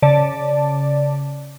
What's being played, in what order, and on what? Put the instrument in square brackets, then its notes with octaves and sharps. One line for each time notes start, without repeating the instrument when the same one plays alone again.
[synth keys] C#3 D5 A5